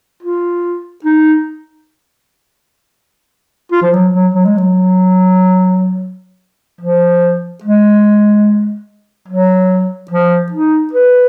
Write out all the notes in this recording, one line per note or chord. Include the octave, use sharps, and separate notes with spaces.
F4
D#4
F4
F3
F#3
F#3
F#3
G#3
F#3
F3
G#3
F#3
F3
D#4
B4